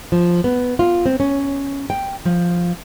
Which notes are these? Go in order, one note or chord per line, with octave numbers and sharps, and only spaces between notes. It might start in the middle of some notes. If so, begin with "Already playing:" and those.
F3
B3
F4
C4
C#4
G5
F3